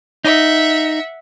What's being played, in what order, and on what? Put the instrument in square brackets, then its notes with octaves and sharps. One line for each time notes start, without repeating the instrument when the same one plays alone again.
[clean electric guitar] D#4 [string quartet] E5 F#5